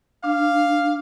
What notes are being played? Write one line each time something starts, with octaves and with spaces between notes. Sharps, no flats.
D4 F5